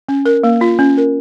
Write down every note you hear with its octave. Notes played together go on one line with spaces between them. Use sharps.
C#4
A#4
A#3
F4
C#4
A#4